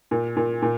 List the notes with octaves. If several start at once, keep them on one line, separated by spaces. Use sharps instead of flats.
A#2
A#2
A#2